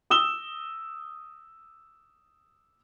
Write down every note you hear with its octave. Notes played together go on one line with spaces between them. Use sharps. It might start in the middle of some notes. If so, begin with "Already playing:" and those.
D#6 E6 E7 G7